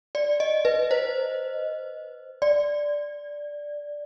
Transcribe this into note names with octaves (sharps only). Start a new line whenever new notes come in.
D5
D#5
B4
C5
D5